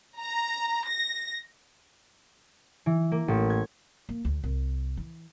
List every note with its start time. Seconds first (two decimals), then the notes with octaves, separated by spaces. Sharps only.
0.20 A#5
0.87 A#6
2.86 E3
3.12 A#3
3.28 A1
3.50 G#6
4.09 A#3
4.25 D2
4.44 C2
4.97 E3